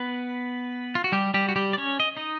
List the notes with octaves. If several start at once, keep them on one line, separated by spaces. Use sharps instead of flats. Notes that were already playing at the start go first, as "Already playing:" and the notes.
Already playing: B3 B4
F4
F#4
G3 G4
G3 G4
F#4
G3 G4
D5
C#4 C#5
D#5
D#4 D#5